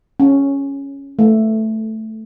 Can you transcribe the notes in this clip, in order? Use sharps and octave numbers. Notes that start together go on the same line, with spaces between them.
C#4
A3